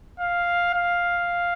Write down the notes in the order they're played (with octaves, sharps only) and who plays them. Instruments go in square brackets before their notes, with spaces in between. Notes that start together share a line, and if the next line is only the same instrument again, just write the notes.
[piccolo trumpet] F5
F5